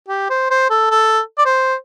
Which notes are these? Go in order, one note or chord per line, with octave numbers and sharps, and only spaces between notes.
G4
C5
C5
A4
A4
D5
C5